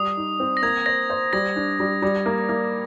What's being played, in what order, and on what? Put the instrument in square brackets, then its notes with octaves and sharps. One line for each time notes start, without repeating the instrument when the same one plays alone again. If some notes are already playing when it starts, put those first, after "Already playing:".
Already playing: [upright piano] G3 [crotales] D#6
[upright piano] D#4
C4
[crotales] A#6
[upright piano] A#3 [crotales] G#6
[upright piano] C5 [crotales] A#6
[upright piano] C5
[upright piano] G3 [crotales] A#6
[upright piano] D4
G3
G3
A#3
A#3